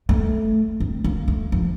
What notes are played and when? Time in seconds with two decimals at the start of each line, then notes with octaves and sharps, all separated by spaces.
0.09 A3
0.80 C4
1.04 A#3
1.28 A3
1.52 F3